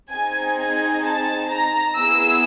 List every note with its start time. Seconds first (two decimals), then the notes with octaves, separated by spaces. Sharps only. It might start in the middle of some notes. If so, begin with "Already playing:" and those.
0.12 C4 D#4 G#4 G#5
0.58 G#5
1.05 A5
1.51 A#5
1.97 B3 E4 G#4 E6